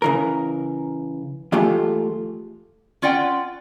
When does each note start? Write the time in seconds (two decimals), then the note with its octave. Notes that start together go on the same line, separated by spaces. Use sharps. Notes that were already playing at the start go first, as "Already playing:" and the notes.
0.02 C#3 E3 A#4
1.52 E3 G#3 A3 F4 G4 A4
3.02 C#4 F4 D5 F#5 G5